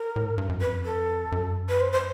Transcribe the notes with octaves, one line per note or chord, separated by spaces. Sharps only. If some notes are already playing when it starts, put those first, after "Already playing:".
Already playing: A#4
A2
G#2
G2
F#2
F2 B4
A4
F#2
B4
C5
C5